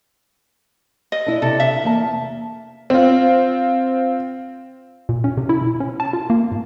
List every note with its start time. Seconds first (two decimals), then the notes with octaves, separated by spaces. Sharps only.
1.12 D#5
1.26 D4 E4
1.42 C3 A4
1.60 E5
1.84 E2 A#3 A5
2.90 C4 F4
5.09 A#2
5.24 C#4
5.37 C3
5.49 E4
5.61 B2
5.80 C#4
6.00 A5
6.13 F4
6.30 A#3
6.51 G#2